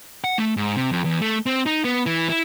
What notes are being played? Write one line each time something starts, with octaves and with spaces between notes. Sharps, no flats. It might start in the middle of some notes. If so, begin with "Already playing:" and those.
F#5
A3
G#2
C3
F2
E2
A3
C4
D#4
B3
E3
E4